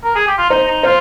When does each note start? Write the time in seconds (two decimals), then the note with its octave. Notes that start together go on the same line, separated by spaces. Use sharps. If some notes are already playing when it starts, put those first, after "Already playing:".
0.04 A#4
0.15 G#4
0.27 G4
0.38 F4
0.50 D#4 C5
0.67 D#4
0.83 F4 C5